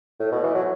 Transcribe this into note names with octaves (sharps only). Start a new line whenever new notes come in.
A2
B2
E3
F#3